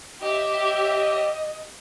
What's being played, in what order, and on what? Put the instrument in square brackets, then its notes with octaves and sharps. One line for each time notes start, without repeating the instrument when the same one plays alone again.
[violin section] G4 E5 [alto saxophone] D#5